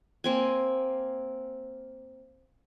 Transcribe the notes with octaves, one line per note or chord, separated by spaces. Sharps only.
A#3 C4 G#5